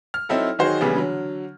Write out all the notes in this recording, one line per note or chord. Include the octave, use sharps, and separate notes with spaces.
F6
F#3 C4 D#4 E4 A4
D#3 F#3 D#4 F#4 G#4 C5
A#1 C#3 E3 G3 B3 G#4
D3 F#3